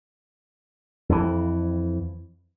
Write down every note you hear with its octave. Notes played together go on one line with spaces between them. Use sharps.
F2 E3